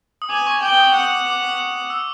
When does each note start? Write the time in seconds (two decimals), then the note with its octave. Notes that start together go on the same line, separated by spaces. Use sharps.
0.22 D#6
0.30 G#5 D6
0.47 C#6
0.62 G5 D6
0.79 D#6
0.94 F#5 D6
1.02 D#6
1.10 D6
1.27 D6
1.90 E6